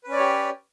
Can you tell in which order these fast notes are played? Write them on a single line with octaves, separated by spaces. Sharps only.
B4 C#4 D5 C#5 G4